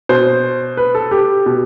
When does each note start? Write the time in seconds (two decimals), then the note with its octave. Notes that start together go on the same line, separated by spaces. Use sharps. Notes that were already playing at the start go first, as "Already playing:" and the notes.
0.09 B2 C5
0.77 B4
0.95 A4
1.11 G4
1.46 B2